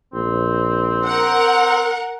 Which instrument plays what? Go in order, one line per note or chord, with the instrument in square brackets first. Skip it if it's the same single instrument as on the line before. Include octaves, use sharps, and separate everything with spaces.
[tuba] A#1 [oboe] C4
[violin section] A#4 F#5